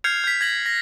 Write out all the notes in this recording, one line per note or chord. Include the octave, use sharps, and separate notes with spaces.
F6 G6 G#6 C7 C#7 F7
G6 B6
G#6 A#6 F#7
A#6